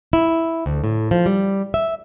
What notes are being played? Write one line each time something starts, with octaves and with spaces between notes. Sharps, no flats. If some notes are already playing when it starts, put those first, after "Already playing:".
E4
D2
A2
F3
G3
E5